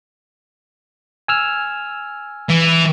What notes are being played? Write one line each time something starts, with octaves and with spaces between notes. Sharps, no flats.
G#5 E6 F6
E3